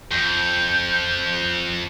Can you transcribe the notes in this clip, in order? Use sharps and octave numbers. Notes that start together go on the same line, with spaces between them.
F2 G6